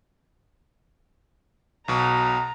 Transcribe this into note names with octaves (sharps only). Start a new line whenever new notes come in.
B1 B2 A#5